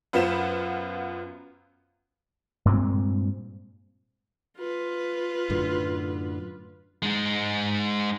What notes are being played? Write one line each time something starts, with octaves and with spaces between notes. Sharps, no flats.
F#2 B3 F4 C5 B6 E7
G2 A#2 G#3 C4
F4 B4
F#2 A2 D3
G#3 D#4